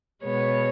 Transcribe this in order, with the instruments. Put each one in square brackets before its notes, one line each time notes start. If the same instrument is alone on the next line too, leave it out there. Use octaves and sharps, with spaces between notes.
[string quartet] B2 G#3 B3 C#5